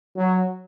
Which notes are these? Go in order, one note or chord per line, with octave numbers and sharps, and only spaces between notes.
F#3